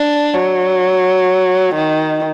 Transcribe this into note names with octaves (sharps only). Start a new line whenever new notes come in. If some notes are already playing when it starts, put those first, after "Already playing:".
Already playing: D4
F#3
D#3